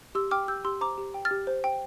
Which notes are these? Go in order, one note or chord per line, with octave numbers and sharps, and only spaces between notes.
G4 C6 E6
G5 D6 F6
G4 E6 G6
G4 C6 E6
C5 A#5 D6
G4
G5
F6 A6
G4
C5
G5